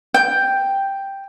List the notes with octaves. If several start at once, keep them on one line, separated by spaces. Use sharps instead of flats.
G5